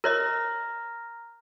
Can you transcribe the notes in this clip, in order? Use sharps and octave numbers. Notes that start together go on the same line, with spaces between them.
A#4 C#5 D#5 A#5 F6 A#6